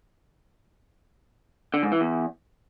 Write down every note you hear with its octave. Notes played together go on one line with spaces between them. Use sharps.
D3
G#2
E3
E2